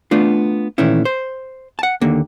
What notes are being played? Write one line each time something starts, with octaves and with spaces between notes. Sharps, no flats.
A3 B3 D4 F4
A#2 D#3 E3 A3 C#4 E4
C5
F#5 A5
D#2 D3 A#3